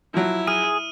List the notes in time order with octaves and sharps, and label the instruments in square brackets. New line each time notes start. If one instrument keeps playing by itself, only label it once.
[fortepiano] F3 F#3 [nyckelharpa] E4
[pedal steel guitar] G#4 [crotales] D#6 F6 D#7